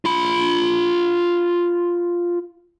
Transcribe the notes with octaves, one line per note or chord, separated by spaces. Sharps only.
F4 B5